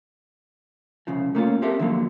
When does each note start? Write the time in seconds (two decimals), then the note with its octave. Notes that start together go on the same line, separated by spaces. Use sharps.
1.07 C2 C#3 F3
1.35 A3 A#3 C#4 F4
1.62 C4 G4 A4 A#4 E5
1.79 D3 D#3 F3 F#3 A#3